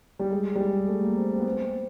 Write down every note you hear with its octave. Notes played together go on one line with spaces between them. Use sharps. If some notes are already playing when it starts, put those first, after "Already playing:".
G3
G#3
G3
G#3
A3
A#3
C4
C4
B3
C4